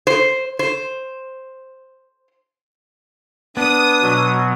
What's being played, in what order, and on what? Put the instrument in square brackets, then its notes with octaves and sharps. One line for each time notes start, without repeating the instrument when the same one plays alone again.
[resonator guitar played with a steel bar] C5
C5
[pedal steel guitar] B3 [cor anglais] D4 [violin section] D#6
[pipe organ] B2 F#3